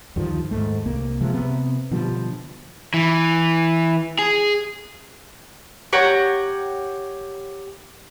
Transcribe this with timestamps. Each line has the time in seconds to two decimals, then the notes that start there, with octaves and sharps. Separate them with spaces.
0.16 D2 G2 D#3 F3
0.51 D#2 G#2 A3
0.86 C2 A#3
1.21 C3 F3 G#3
1.34 C3 B3
1.91 B2 D3 F3 G3
2.94 E3
4.19 G#4
5.93 G4 C#5 F#5 A#5